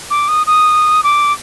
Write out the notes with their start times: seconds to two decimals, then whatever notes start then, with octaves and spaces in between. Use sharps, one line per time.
0.10 D6
0.28 D#6
0.47 D#6
1.04 D6